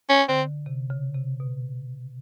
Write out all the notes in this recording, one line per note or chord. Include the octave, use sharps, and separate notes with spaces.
C#4
D3 C4
C3
C#3
C3
B2